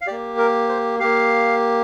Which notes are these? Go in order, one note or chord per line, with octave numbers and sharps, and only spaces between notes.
F5
A#3 G4 D5
A#4
C5
A#3 G4 F5